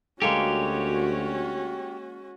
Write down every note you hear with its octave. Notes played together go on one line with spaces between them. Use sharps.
D2 G#3 A#3 C#4 F#4 G4 A4 C#5